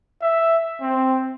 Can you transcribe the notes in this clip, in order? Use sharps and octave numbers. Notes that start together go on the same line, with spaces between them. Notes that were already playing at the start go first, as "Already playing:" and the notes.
E5
C4